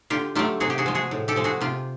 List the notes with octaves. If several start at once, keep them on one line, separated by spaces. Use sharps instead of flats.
D3 F4 G4
F#3 A3 F4 G4
C3 F#4 G#4
G4
F#4 G#4
F3 G#3
F#4 G#4
A2
G4 A4
F3 G#3
F#4 G#4
C3 F4 G4